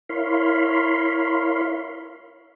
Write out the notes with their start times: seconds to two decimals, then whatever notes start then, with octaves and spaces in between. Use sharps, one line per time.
0.09 E4 A#4 C#5 F5 B5 C6